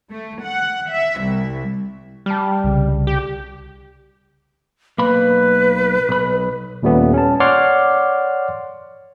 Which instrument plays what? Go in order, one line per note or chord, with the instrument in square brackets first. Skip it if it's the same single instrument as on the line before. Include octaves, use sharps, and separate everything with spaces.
[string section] A3
F#5
E5
C2
[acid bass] G3 [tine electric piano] A5 F6
[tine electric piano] C2 C#3
[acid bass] G4
[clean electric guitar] B1 A#3 B5 [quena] B4
[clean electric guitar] B1 B5
[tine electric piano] D#2 A#2 G3 A3 B3 C#4
C#4 A5
C#5 D5 F#5 C6 D6 F6